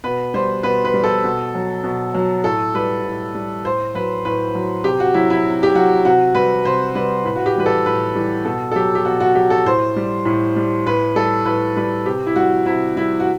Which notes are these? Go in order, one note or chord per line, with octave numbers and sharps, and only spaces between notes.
B2 B4
G3 C5
B2 B4
B4
G3
A4
B2
F#3
B2
F#3
A2 A4
G3 B4
A2
G3
A2 C5
F#3 B4
A2 B4
F#3
C3 G4
F#4
F#3 E4
E4
C3
G4
F#3 F#4
C3 F#4
G3 B4
C3 C5
G3 B4
A2 B4
F#4
G4
E3 G3 B4
A4
A2 B4
E3 G3
B2 A4
A4
F#3 G4
G4
B2 F#4
F#4
F#3 G4
A4
A2 C5
G3
A2
G3
A2 B4
G3 A4
A2 B4
G3 B4
C3 G4
E4
G3 F#4
C3 E4
G3 E4
F#4